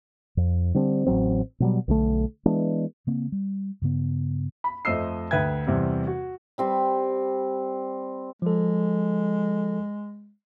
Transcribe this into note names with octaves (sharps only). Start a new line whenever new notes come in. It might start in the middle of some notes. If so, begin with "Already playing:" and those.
F2
D3 G3 C4 D4
A1 E3 F#3 C4
B2 F#3 G3
B1 D3 G3 A3
E3 G#3 B3 D4
C#3 A#3 C4
G3
G2 C#3 B3
B5
F2 A3 C5 D#5 E6 C7
D2 B4 E5 G5 G#6
E2 C3 G3 C4
F#4
G3 C4 B5
F3 G#3 A4